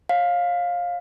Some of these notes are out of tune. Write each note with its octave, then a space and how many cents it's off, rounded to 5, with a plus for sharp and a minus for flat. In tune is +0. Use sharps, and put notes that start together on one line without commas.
C#5 -15 F5 +15